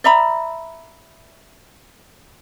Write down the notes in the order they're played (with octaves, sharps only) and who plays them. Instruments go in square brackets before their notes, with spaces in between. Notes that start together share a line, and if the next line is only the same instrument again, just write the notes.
[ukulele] D5 E5 A#5 B5